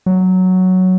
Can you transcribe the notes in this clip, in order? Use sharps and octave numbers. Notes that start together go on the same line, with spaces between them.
F#3